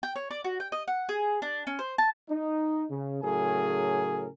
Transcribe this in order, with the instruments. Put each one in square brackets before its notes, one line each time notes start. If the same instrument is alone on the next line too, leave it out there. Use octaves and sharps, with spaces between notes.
[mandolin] G5
C#5
D5
F#4
G5
D#5
F#5
G#4
D4
C#4
C5
A5
[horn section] D#4
C#3
A2 C#3 F#3 G#4 A#4 G#5